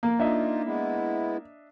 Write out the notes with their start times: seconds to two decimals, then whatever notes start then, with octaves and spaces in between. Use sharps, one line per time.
0.03 A#3
0.19 D4 D#4 F4 D#5 E5
0.64 G#3 B3 E4